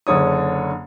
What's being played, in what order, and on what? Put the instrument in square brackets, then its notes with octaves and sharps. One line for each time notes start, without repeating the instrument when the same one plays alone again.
[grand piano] F#1 D3 C#5 D#6